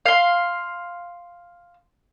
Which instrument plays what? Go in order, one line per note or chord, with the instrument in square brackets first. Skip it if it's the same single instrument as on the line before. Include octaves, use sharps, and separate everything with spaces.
[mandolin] F5 C6